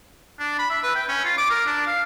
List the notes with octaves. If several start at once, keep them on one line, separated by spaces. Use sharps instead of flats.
D4
B5
E5
B4
G5
C#4
F4
D6
A#4
D4
F5